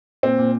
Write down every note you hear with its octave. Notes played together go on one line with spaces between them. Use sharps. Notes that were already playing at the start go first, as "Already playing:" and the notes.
A#2 C4
A#2